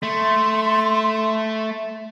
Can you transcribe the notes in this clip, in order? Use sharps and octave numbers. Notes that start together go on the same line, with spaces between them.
A3 C6